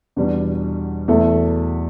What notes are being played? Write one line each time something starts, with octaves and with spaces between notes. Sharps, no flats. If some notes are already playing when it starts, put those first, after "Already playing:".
E2 B2 G3 D4
E2 B2 A3 E4 A4